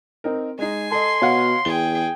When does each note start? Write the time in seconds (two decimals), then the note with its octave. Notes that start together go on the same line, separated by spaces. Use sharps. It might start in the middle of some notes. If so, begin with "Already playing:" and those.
0.24 C4 D#4 A#4
0.59 G#3 D#4 G#5 C7
0.91 A4 D#5 C6
1.22 B2 C#5 F5 F#5
1.65 E2 G#4 G5 G7